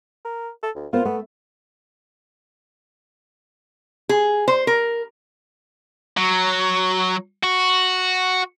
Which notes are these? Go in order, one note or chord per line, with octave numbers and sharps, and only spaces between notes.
A#4
A4
D2
B3 F4 A#4 C5
A3 B3
G#4
C5
A#4
F#3
F#4